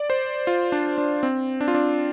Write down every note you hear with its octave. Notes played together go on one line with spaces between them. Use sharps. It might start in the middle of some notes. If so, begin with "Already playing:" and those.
Already playing: D5
C5
F4
D4
D4
C4
D4
F4
D4